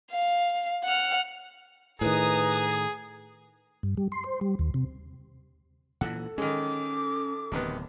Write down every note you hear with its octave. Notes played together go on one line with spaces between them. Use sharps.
F5
F#5 F6
A2 D#3 G#4 B4 A#5 D#6
G2
G3
C6
C5
G3
D#2
C3
A#2 E3 A4 F#5
D#3 G#3 C#4 D6
D1 C3 D#3 B3